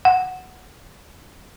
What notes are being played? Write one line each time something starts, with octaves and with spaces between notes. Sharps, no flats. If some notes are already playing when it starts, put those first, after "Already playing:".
F#5